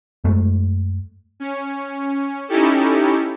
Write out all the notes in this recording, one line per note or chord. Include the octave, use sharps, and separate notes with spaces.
F#2 G#3 A3
C#4
C#4 D#4 E4 G4 A4